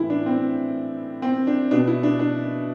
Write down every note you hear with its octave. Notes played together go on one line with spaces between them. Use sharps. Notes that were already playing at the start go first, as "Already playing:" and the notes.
Already playing: A2 E3 E4
D4
C4
C4
D4
B2 D4
E4
D4
D4